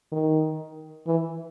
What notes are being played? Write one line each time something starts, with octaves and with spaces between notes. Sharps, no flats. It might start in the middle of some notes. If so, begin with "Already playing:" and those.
D#3
E3